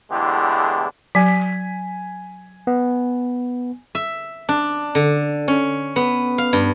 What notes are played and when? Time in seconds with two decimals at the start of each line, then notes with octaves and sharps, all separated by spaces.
0.11 E2 A2 D3 G#3 E4 G4
1.15 F#3 G#5 B6
2.67 B3
3.95 E5
4.49 D4
4.95 D3
5.48 C#4
5.96 B3
6.38 F5
6.53 G2